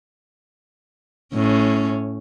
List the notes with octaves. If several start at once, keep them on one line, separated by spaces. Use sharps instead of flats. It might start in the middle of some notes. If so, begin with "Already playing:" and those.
A2 C#4